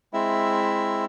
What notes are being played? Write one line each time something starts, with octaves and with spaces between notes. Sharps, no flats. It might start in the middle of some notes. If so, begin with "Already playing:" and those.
G#3 C4 E4 E5